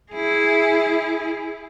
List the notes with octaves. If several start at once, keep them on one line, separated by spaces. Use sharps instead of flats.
E4 G#4